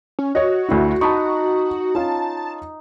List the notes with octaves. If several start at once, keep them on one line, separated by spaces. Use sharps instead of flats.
C#4
F#4 C#5 D#5
D2 E4
D#4 A5 B5 C#6
C#4 F4 A5